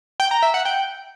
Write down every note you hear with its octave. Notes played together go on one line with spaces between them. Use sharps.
G5
A#5
E5
F#5
G5